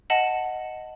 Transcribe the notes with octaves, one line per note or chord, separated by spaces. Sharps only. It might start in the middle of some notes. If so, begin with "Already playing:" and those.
D#5 F#5 A5 F#7